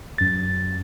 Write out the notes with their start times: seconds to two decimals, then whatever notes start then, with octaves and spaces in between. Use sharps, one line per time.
0.18 F#2 A6